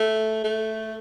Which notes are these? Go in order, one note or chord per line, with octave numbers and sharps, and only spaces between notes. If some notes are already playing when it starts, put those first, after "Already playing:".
Already playing: A3
A3